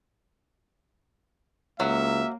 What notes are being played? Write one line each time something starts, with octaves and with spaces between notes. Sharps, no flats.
C#2 F#3 A#3 E5